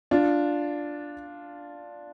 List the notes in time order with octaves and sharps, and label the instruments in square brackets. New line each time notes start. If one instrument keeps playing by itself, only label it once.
[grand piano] D4 F4